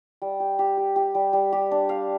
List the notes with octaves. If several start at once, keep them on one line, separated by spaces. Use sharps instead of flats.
G3
G4
G4
G4
G4
G3
G3
G4
D4
F5